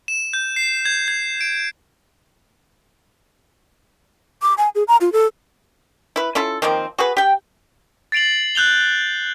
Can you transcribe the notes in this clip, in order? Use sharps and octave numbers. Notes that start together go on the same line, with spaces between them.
E7
G6
C7
G#6
G#6
D7
D6
G#5
G#4
A#5
F4
A4
E4 B4
C#4 E4 F4 A4
D#3 F3 A#3 C4
F#4 G#4 B4
G4 G5
A6 C7 D7 F7 F#7
F#6 G6 F7 G7